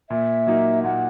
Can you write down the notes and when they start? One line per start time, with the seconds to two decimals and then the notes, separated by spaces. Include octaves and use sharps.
0.10 A#2 E5
0.47 F#3 A#3 D#4
0.84 A#2 F#5